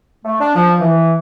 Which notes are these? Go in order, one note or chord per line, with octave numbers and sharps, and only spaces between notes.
A3
D4
F3
E3